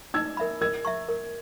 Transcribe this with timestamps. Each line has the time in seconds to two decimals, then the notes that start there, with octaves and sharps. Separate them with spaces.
0.14 D#4 E6 G#6
0.37 A#4 E5 B5
0.61 A#4 E6 G#6
0.85 E5 A#5 C#6
1.08 A#4